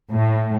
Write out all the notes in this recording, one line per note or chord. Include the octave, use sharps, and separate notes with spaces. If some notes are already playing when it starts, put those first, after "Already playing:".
A2